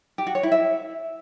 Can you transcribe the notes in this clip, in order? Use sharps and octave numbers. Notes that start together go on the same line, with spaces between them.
G4
F#4
C#5
E4
E5